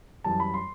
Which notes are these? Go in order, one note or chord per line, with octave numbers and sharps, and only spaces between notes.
F#2 E3 G3 A5
B5
C6